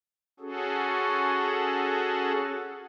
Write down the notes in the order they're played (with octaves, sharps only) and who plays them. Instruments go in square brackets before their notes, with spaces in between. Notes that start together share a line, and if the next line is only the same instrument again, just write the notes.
[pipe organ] C#4 F#4 G#4 A4